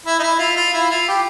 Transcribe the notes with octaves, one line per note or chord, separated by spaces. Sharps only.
E4
D#4
E4
F4
F4
E4
F4
G4